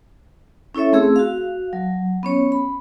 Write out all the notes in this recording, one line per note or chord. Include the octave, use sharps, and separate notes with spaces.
C#4 E4 A4 C#5 E5
A3 C4 G#4 E6
F#4 F5
F#3
B3 C#4 C#5
B5